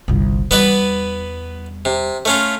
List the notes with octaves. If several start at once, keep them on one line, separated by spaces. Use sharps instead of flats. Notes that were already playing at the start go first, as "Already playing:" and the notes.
G1 C2
E2 G3 B3 B4 D5
C3
A3 C#4 F4